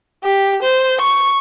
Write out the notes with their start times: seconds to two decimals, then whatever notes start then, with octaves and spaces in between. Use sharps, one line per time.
0.24 G4
0.62 C5
1.01 C#6